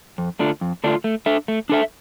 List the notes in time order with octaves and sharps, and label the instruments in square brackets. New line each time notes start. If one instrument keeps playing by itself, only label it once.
[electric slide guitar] F2
D3 A3 D4 F4
F2
D3 A3 D4 F4
A3
D4 A4 E5
A3
D4 A4 E5